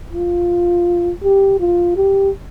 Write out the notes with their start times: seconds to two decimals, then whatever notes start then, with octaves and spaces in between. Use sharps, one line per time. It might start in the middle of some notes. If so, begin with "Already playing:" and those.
0.13 F4
1.24 G4
1.60 F4
1.97 G4